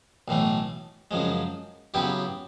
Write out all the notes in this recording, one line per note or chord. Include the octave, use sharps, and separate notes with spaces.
B1 A2 E3 A3
F#2 C#3 F3 G#3
C#3 F#3 B3 E4 G4